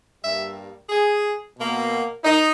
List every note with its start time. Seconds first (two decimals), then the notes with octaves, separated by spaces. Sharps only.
0.23 G2 G3 A#3 E5
0.89 G#4
1.56 B2 A#3
2.24 D#4